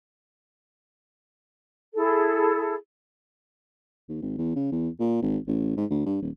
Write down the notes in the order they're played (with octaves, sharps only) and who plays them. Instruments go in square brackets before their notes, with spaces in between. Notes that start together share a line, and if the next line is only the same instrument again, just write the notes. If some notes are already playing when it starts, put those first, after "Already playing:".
[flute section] E4 G#4 A4
[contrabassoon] D#2
G#1
E2
C#3
E2
A#2
G#1
A1
G#2
D2
G2
D#1